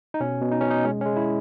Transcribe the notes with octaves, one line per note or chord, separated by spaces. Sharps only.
D#4
B2 C#4
B2
D#4
B2 C#4
D#4
G#3 C#4
C#4
G#3
E4